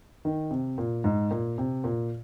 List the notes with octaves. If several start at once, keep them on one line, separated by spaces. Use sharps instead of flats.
D#3
C3
A#2
G#2
A#2
C3
A#2